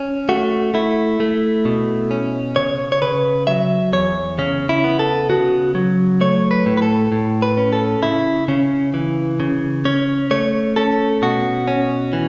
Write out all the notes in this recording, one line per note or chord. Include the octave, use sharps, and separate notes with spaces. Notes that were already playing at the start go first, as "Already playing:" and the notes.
Already playing: C#4
A3 F#4
A3 E4
A3
B2
C#4
C#3 C#5
C#5
C#3 B4
F#3 E5
E2 C#5
C#3 C#4
E4
B3
A4
C#3 F#4
F#3
A3 C#5
B4
A2
B4
A4
A2
B4
C#4
A4
C#3 E4
C#3 C#4
E3
C#3
C#4 C#5
A3 C#5
C#4 A4
B2 F#4
C#4
E3